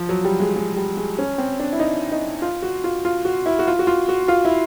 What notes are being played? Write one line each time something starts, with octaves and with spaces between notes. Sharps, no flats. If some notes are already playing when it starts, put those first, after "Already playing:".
Already playing: F3
F#3
G3
G#3
G#3
G3
G#3
C#4
C4
D4
E4
D#4
D#4
F4
F#4
F4
F4
F#4
E4
F#4
F4
F#4
F4
F#4
F4
E4